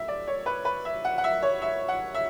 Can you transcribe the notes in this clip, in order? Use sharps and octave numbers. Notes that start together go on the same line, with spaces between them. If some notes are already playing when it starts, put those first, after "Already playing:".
Already playing: A2 E5
D5
C#5
B4
B4
E5
F#5
F#5
E5
C#5
E5
F#5
E5